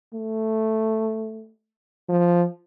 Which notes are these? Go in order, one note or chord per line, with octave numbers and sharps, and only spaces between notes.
A3
F3